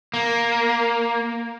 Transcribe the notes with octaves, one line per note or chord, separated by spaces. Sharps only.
A#3